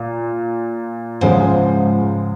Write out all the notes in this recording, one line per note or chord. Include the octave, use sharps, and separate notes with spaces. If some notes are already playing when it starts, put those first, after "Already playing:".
Already playing: A#2
C#2 G#2 C#3 F3 G#3